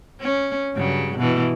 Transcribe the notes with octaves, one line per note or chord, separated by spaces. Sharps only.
C#4
G2 C#3 F#3
B2 E3